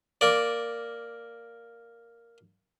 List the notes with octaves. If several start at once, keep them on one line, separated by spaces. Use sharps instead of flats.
A#3 D5